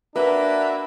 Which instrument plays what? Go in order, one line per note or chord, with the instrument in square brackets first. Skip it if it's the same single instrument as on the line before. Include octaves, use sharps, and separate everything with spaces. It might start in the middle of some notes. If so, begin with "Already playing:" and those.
[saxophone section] A#3 F#4 E5 [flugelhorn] D4 [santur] B4